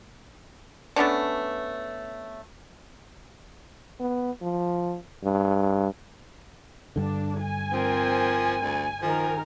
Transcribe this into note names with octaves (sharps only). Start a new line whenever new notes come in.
A3 B3 C#4 D4
B3
F3
G2
G2 D3 D4
G#5
F3 C4 A#4
D2
D#3 F3 A#4 G#5